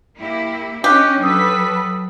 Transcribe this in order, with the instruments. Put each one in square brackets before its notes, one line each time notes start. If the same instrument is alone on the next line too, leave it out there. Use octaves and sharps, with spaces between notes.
[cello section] A#3 E4 G4
[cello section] C#4 [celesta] D4 F#6 [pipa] G4 [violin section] D#5
[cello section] F#3 [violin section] A4 B4 B6 [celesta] D#6 E6